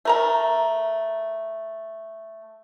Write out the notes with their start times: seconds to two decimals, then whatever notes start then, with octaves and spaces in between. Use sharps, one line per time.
0.05 A3 A#4 A#5